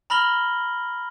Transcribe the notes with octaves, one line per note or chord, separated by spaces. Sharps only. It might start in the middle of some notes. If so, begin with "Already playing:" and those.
A#5 B5 F6 A#6 F#7 G7